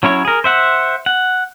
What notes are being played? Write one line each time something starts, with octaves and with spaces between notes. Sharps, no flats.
F#3 C#4 E4 C#5
G#4 A#4
C5 E5 F#5
F#5